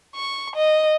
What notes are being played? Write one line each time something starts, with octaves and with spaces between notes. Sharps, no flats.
C#6
D#5